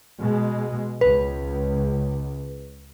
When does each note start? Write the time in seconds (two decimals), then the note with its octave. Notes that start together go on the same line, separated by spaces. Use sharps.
0.19 B2 G#3
1.01 C#2 B4